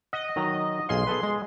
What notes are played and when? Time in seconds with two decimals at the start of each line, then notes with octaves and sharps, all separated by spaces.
0.13 D#5 F#5
0.36 D#3 F#3 A#5
0.89 B1 G#4 F5 C6
1.07 G#4 A4 B4
1.23 G#3